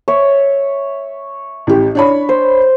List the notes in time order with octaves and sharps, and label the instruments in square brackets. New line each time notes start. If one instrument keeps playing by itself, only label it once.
[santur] C#5 E5
[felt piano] A1 G4
D4 C#5 B5
[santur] C5